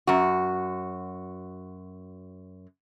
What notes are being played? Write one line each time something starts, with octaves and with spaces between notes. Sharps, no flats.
F#2 F#4